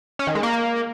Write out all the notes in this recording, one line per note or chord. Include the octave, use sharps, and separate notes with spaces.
C#4
D#3
G#3
A#3